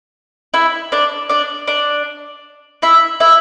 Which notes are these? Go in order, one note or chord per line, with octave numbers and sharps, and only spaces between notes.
E4 E5
D4 D5
D4 D5
D4 D5
E4 E5
E4 E5